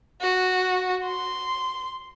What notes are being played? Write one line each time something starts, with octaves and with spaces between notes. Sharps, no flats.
F#4
C6